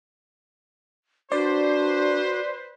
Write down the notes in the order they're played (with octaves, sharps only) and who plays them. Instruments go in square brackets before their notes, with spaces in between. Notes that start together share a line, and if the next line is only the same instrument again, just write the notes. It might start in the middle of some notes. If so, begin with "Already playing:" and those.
[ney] D4 [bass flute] F#4 [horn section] B4 C5 [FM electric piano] D5